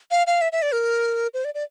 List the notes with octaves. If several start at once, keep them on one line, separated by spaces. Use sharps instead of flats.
F5
F5
E5
E5
D5
A#4
C5
D5
D5